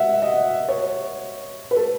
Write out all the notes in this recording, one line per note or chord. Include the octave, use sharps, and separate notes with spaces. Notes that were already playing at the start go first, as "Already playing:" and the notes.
Already playing: E5 F#5
D#5
C#5
B4
A4